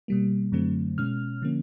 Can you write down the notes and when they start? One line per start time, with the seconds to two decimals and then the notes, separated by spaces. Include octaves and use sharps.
0.08 B2 G3 A#3
0.52 F#2 D3 F#3 A3 C4
0.98 B2 G#3 C#4 F6
1.42 D3 F3 A#3 C#4